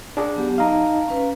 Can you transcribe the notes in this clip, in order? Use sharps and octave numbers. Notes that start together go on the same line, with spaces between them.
D4 G#4
F#3 B3 G4
D#4 D#5 F5 A5 A#5
C#4 B4